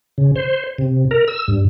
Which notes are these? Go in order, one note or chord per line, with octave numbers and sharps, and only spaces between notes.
C#3
C5
C3
A#4
E6
G2